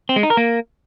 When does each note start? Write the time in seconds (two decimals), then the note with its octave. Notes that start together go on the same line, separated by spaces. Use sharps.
0.09 C4
0.16 G#3
0.23 D#4
0.30 A#4
0.37 A#3